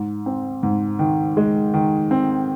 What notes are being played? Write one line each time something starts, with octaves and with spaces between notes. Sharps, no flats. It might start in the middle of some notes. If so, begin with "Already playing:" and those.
Already playing: G#2
C4
G#2
D#3
G#3
D#3
C4